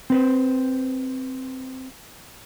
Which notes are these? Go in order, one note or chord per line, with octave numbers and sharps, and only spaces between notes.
C4 B4 C5